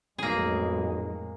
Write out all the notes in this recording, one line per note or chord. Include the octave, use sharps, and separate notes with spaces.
B1 F2 A2 G#3 A#3 G#4